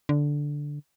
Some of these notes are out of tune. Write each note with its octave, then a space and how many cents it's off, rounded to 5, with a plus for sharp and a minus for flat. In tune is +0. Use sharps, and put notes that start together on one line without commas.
D3 -5